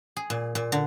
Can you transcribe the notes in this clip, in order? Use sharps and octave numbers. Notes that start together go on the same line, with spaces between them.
G#4
A#2
A#2
D3